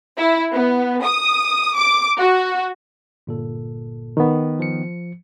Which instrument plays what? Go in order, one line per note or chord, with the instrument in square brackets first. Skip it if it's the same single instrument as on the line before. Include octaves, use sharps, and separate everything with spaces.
[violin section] E4
B3
D#6
D6
F#4
[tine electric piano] G1 A#2 A4
[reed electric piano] D#3 B3
[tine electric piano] F3 C#7